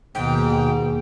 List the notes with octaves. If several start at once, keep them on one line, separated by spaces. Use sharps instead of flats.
D#2 G#2 B2 G5